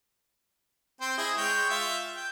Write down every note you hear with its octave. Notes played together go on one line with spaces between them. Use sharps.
C4 C5 G5
E4 G#4 D#5
G#3 C#5 G5
F4 E5
G5